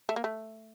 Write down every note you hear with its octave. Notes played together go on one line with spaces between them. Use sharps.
A3
A#3
A3